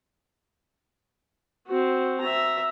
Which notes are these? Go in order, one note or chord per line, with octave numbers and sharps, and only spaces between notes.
C4 F#4
E5 A#5